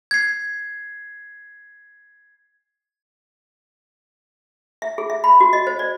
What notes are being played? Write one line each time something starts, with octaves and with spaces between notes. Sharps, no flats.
G#6 C7
E5
G#4
E5
B5
F#4
D#5
C5
D5